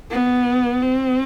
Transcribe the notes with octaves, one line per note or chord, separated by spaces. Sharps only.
B3
C4